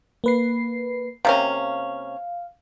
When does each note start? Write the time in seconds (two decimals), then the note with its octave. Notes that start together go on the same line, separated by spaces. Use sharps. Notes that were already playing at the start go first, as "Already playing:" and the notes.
0.24 A#3 B4 C7
1.25 C3 A#3 C#4 F5